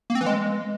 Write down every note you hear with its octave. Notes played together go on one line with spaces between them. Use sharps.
A#3
C4
E3
G#3